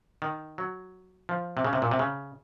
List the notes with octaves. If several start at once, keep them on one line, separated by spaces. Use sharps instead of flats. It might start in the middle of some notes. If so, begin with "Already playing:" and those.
D#3
F#3
F3
C3
C#3
C3
A#2
C3
C#3